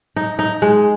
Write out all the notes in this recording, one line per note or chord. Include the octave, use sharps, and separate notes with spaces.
D#4
D#4
G#3